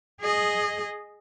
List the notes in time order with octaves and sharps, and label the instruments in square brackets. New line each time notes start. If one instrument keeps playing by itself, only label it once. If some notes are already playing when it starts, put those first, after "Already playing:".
[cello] G#4 D#5